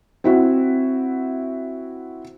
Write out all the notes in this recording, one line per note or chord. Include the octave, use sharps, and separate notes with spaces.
C4 E4 F#4